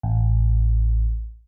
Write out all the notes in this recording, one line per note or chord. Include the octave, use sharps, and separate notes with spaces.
A1